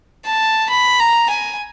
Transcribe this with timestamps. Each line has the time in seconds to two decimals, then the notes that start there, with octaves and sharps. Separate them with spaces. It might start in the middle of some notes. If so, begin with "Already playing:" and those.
0.26 A5
0.69 B5
0.99 A#5
1.30 G#5